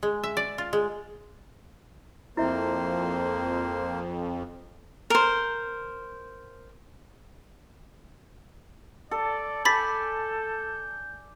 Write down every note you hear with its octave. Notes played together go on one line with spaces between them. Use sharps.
G#3
E5
D5
F4
G#3
F2 A#3 E4 C5 E5
A#4 C5
A4 D5
A4 D5 G#5 B5 G6 A6 B6